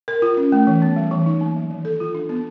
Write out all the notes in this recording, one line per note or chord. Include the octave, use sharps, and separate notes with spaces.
A#4
F4
C#4
A3
E3
B3
G3
E3
D#4
A#3
F#3
D#3
A4
F4
D4
B3